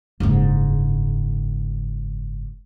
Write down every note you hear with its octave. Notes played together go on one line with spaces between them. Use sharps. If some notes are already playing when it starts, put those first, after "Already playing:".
F#1 G#2